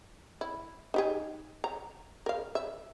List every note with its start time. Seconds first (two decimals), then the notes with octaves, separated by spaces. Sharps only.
0.41 E4
0.94 D#4 G4 G#4
1.64 A#5
2.26 A#4 F5
2.55 E5